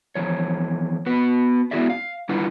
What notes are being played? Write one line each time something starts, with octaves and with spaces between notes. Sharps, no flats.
E2 F3 C#5
B3 F#4 B4
B3 E4 F#4 G#4 D5 E5
F5
G3 D4 E4 F4 B4 F#5